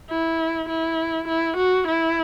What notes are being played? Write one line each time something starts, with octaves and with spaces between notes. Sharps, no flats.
E4
E4
E4
F#4
E4